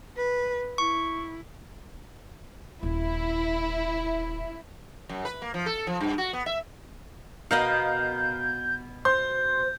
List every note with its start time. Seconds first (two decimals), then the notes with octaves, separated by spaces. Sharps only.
0.16 B4
0.78 E4 C#6
2.83 D#1 E4
5.09 F#2
5.25 B4
5.42 A#3
5.54 F3
5.66 A4
5.87 F3
6.00 G2
6.18 F#4
6.33 B3
6.46 E5
7.51 B2 B3 A#4 D#5 F5 G6
9.05 C5 C6 G6